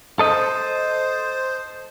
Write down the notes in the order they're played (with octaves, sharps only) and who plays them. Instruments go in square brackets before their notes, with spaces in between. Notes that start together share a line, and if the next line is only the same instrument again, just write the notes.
[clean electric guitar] A4 D#5 [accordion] C5